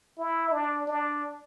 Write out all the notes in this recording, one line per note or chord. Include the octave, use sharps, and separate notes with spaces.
E4
D4
D4